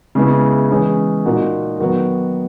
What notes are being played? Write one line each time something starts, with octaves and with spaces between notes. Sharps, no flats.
C#3 G#3 B3 E4
E3 G#3 C#4
A#2 A#3 D#4 F#4 A#4
D#3 F#3 B3 F#4 A#4